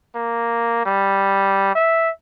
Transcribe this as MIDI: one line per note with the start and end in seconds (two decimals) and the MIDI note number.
0.16 0.82 58
0.86 1.73 55
1.76 2.10 76